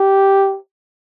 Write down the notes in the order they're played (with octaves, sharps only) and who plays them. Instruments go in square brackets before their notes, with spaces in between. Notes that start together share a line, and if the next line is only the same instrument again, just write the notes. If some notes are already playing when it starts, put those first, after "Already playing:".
Already playing: [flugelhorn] G4